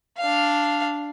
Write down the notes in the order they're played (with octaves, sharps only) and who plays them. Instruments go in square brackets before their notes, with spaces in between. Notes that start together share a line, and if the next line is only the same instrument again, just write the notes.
[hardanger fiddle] D4 F5